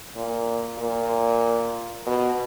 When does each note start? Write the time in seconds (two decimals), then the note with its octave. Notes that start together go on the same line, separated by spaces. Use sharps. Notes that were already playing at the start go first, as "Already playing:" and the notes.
0.15 A#2
0.78 A#2
2.06 B2